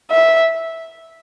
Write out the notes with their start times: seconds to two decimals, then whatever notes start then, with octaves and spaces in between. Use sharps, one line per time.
0.11 E5